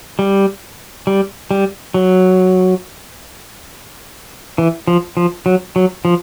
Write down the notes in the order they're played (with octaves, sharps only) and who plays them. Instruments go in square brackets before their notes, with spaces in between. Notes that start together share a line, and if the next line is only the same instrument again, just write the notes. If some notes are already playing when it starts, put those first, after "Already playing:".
[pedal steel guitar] G3
G3
G3
F#3
E3
F3
F3
F#3
F#3
F3